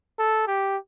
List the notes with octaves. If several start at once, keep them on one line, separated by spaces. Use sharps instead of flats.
A4
G4